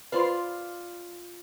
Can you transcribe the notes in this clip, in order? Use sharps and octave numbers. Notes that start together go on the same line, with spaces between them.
F4 B4 C5 D5 F5 C6